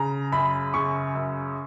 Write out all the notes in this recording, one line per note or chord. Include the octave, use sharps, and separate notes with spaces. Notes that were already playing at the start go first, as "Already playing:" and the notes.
Already playing: C#3 A#5
F#2 B5
C#3 C#6
F#2